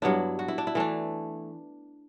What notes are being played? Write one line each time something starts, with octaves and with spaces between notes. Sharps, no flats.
G2 F#3 B3 D4 E4
F#4
E4
D4
E4
E3 A3 D4